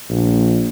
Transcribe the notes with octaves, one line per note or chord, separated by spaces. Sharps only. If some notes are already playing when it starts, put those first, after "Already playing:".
A#1